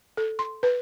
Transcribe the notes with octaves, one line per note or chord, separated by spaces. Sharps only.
A4
C6
B4